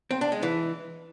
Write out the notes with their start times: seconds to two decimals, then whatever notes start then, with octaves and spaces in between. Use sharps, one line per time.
0.11 C4
0.21 D4
0.32 G#3
0.43 E3